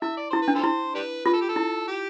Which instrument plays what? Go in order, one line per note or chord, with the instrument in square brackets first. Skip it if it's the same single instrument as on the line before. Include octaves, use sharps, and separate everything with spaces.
[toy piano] E4 [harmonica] E5
[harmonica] D5
[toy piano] E4 [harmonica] C5
[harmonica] B4
[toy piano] D4
[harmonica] F4 A4 C5
[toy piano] E4
[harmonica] D4 G4 B4
[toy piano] F4 [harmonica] B4
[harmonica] A4
G4
A4
[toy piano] E4
[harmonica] G4